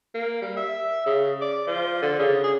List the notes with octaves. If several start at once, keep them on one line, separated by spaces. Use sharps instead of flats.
A#3
G3
E5
C#3
D5
F3
D3
C#3
G#4